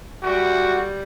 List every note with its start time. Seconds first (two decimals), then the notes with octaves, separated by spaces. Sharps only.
0.23 G3 F#4